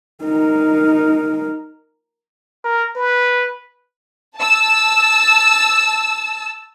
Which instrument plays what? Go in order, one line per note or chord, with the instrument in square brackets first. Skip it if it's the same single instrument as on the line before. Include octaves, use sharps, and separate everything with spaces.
[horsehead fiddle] D#4 A#4
[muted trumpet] A#4
B4
[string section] A5 E6